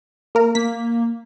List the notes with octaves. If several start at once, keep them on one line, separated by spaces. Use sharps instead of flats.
A#3 A#4
A#3 B6